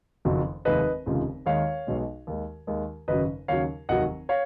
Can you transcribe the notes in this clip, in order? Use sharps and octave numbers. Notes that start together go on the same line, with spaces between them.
F#1 F2 D#3 F#3
F1 D#2 D#3 G#3 B4 D#5
F1 D#2 C#3 F3 G#3
D#2 D#3 G#3 C#5 F5
B1 B2 G#3
D#2 D#3 G#3
D#2 D#3 G#3
G#1 F#2 C#3 F#3 B4 D#5
D#2 C#3 F#3 C#5 F5
F1 D#2 D#3 F#3 D#5 F#5
C#5 F5